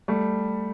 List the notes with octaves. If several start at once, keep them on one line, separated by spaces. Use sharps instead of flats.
G3 A3